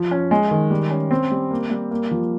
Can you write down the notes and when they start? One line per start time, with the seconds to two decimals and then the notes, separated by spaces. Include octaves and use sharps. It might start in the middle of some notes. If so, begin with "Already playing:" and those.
Already playing: F3
0.11 C#4
0.31 G#3
0.51 D#3
0.71 G3
0.91 C#4
1.11 C4
1.32 G3
1.51 A#3
1.71 G3
1.91 A#3
2.11 F3